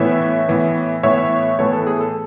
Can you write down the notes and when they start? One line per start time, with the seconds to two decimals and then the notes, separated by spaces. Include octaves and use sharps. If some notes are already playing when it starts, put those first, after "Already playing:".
Already playing: A2 E3 B3 C#5 E5
0.48 A2 E3 B3
1.03 A2 E3 B3 C#5 E5
1.59 A2 E3 B3 A4 C#5
1.73 A4
1.87 G#4
2.01 A4